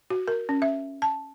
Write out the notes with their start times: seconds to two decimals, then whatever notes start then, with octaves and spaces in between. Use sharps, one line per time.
0.10 F#4
0.28 A#4
0.49 C#4
0.62 E5
1.02 A5